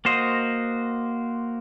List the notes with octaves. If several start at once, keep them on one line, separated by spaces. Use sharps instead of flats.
A#3 F#4 C5 D#5